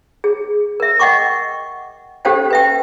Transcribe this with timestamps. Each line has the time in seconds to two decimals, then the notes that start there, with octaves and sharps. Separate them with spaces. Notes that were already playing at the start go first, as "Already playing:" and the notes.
0.24 G#4
0.80 A#4 E5
0.99 D#5 F#5 G5 C#6 D6
2.25 C#4 G4 A4 C5 F5 G5
2.51 B4 E5 G5